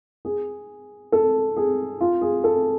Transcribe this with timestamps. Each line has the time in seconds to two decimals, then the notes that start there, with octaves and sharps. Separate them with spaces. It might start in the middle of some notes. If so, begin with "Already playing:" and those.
0.25 G#4
1.12 A4
1.57 G#4
2.01 F4
2.21 G#4
2.44 A4